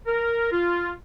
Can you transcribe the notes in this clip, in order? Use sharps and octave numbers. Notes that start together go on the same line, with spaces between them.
A#4
F4